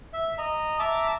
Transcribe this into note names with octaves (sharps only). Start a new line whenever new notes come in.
E5
D#5 A#5
E5 A5 A#5 D6